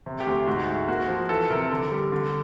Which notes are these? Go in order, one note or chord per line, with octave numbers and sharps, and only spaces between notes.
C3
G4
D2
G#2 F#4
G#3
A#3 F#4
F3
E3 A4
C3 A#4
D3
G3
D3